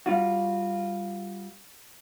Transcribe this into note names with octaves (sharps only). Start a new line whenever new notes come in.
G3 F4 F#4